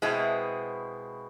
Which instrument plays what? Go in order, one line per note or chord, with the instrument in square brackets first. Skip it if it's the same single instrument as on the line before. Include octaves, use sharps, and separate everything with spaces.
[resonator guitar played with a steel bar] B2 G#3 C4 E4